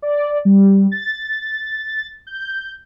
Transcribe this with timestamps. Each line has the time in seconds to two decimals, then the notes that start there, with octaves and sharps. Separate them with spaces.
0.02 D5
0.45 G3
0.92 A6
2.27 G6